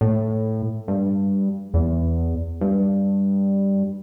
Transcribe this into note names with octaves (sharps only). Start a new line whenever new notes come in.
A2
G2
E2
G2